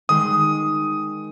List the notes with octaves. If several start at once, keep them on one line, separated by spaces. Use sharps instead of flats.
D#3 G#3 D#6